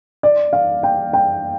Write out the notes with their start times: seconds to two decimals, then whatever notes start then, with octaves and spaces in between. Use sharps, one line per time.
0.23 D5
0.53 F5
0.83 G5
1.13 G5